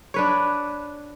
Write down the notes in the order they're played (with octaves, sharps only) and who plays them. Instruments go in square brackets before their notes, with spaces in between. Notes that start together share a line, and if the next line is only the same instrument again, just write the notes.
[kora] D4 B4 C#5